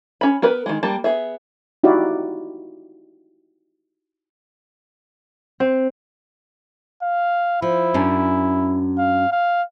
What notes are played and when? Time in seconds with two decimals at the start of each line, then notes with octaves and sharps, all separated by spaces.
0.21 C#4 B5
0.42 B3 A#4 B4 B5
0.66 D#3 G#3
0.83 G3 A#3 A5
1.04 B3 G#4 E5
1.84 D#4 E4 F#4 G4 D5 F5
5.60 C4
7.03 F5
7.62 F3 E4
7.94 F#2 C#4 D4
8.98 F5
9.32 F5